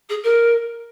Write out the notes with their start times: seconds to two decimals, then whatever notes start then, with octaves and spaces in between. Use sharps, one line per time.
0.09 G#4
0.23 A#4